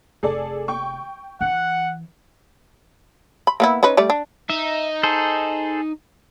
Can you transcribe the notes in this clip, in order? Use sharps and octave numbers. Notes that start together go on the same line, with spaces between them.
F1 G#4 A4 D5
G5 C#6
E3 F#5
B5
A#3 B3 E4
C#4 D#4 B4
G3 A3 D5
D4
D#4 E5
G#4 A4 C5